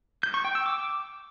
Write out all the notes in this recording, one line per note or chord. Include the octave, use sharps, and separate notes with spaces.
G6
C#6
G5
E6
D6